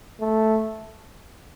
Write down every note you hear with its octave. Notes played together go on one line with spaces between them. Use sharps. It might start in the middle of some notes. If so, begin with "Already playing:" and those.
A3